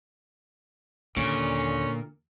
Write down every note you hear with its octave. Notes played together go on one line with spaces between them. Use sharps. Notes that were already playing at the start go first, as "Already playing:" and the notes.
D#2 A#2 D3 C#4